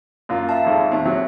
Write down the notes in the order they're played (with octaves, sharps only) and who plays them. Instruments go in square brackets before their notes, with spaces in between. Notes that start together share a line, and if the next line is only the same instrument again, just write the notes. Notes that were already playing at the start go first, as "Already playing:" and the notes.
[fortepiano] F#2 A#3 F4
[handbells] E5 F5 A5
[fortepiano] G#1 F2 G#2
[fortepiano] D#2 [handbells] C4 E5
[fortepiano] G#1 F#3